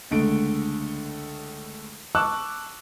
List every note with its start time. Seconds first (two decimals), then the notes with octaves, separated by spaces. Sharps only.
0.11 C#2 D3 A3 D7
2.15 A5 C#6 D6 E6 F#6